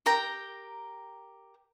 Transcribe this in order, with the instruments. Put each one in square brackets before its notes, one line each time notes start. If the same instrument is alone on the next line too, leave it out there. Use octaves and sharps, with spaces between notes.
[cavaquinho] G4 A#4 G5 A#5